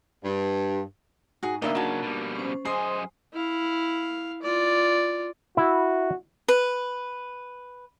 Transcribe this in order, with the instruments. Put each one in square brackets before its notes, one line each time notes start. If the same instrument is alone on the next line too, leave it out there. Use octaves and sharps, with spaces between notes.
[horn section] G2
[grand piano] G#2 [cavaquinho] F#4 G#4
[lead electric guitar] D2 B2 [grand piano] A#3 D4 D#4 [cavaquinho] D#5 E5
[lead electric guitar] C#3 F#3 [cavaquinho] F#4 A5
[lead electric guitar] B2 G3
[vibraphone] C#4 C5
[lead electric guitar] F#2 D#5 [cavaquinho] G#4 [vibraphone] C5 G#5 C6 [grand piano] C7
[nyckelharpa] E4 F5
F4 D5
[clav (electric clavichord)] E4 [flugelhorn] F#4
[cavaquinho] B4